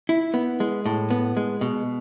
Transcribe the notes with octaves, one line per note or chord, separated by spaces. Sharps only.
E4
B3
G#3
A2
B3
G#3
B2